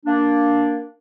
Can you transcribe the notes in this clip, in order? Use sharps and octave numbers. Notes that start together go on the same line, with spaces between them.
A#3 D4